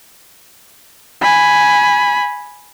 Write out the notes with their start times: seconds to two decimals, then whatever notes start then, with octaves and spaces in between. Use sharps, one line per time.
1.21 G#5 B5